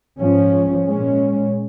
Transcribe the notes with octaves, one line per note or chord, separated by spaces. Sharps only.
G#2 F3 C#4
A#2 G#3 C#4